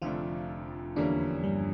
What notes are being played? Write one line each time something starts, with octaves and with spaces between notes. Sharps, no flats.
F1 F2 D3 F3 A3 D4 F4
E2 D3 E3 G3 A#3 C#4 D4
G2 G3